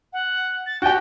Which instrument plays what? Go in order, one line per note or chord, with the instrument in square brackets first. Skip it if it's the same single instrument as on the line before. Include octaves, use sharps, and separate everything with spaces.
[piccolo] F#5
A6
[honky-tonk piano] F#4 G4 [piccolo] G5